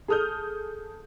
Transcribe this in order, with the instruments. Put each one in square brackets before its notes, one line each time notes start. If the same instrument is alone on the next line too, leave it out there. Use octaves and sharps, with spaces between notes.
[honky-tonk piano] G#4 A4 D#6 F6 G6